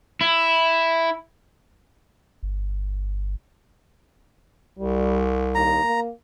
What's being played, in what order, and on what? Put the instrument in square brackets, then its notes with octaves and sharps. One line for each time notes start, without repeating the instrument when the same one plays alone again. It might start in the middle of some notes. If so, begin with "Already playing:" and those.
[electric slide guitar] E4
[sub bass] G1
[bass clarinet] C2 [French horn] G3
[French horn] D#2 [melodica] A#5
[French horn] A#3